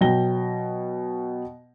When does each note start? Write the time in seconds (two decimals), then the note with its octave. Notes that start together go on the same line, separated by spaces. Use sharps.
0.01 B2 F#3 G5 A#6 G7